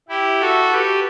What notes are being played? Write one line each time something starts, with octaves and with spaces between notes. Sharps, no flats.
E4 G4
F#4 A4
G4 B4